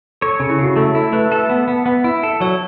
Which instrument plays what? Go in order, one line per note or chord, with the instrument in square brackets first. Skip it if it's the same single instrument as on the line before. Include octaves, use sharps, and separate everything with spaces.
[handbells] A4 [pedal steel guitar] C#5
[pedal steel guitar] C#3 [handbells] A4
[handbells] E4
[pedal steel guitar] C#3 [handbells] F#4
[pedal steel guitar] A3 [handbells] A4
[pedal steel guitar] E4 [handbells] A4
[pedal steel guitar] A3 [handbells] B4
[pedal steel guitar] A4 [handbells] E5
[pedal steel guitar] B3
B3
B3
E4
A4
[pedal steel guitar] F#3 [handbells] C#5